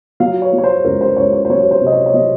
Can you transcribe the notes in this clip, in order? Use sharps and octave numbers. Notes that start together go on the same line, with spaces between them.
F#3 F5
C#5
F#3
C#5
C5
C#2 A#4
C5
C#2 C#5
C#5
C5
F#3 C#5
C#5
C5
C3
D#5
C#5
C#5
F#3 D#5